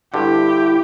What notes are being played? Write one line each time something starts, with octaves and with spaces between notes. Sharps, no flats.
G2 D3 E4 G4